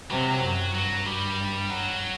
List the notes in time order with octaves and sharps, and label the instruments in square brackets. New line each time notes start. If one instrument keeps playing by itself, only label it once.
[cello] C3 [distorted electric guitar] F#3
[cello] F#2
[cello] G2 [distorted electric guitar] F#3
[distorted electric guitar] G3
F#3